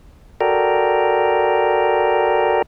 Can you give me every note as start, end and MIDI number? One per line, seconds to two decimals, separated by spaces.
0.41 2.62 66
0.41 2.62 69
0.41 2.62 70
0.41 2.62 74
0.41 2.62 79
0.41 2.62 82